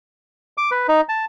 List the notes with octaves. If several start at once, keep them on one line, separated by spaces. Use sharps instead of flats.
D6
B4
D#4
A5